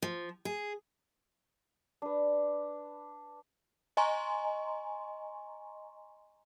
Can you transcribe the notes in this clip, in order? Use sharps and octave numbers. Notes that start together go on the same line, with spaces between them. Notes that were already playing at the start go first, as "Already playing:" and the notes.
F3
G#4
D4 B4
D#5 G#5 A#5 C6 C#6